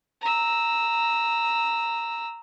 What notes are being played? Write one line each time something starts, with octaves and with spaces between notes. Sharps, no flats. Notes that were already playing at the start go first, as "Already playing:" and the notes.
A#5 E6